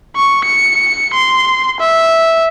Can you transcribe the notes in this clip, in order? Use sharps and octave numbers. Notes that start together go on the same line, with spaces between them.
C#6
C#7
C6
E5